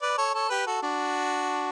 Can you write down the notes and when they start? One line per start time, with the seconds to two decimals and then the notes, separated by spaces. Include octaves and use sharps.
0.02 B4 D5
0.18 A4 C#5
0.34 A4 C#5
0.50 G4 B4
0.67 F#4 A4
0.82 D4 F#4